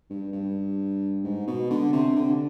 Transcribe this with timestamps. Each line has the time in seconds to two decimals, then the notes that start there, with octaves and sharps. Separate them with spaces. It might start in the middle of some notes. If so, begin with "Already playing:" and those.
0.10 G2
0.33 G2
1.24 G#2
1.47 B2
1.70 D3
1.92 C3
2.16 D3